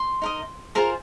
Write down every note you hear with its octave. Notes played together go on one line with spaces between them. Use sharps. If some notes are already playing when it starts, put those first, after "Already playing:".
Already playing: C6
D#4 A#4 D#5
F4 G#4 A#4 C5 A#5